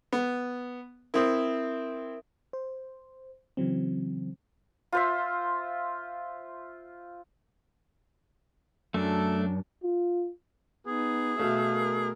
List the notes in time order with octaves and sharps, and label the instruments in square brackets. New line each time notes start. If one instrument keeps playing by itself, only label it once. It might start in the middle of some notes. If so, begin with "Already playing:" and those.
[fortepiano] B3
[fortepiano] C4 E4 [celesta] A#4 E5 D#6
[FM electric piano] C5
C#3 E3 F#3 C4
[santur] F4 C5 E5
[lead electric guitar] F#2 [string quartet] F#3 D4 [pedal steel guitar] A3 A4
[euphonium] F4
[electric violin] B3 D#4 [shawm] G#4
[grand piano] B2 A3 [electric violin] E5 F5
[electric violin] A#4